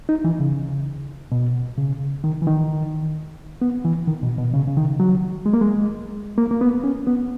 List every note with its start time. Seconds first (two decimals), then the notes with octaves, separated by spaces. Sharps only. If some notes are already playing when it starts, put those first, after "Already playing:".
0.09 D#4
0.24 E3
0.40 C#3
1.32 B2
1.78 C#3
2.24 D#3
2.42 E3
2.47 D#3
3.62 B3
3.85 E3
4.08 D#3
4.23 B2
4.38 B2
4.54 C#3
4.67 C#3
4.77 D#3
5.00 F#3
5.46 G#3
5.53 A#3
5.61 G#3
6.38 A#3
6.51 A#3
6.61 B3
6.84 C#4
7.07 B3